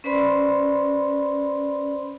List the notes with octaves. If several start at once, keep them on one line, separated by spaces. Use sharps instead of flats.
C#4 B4 C5 D5 B5 C6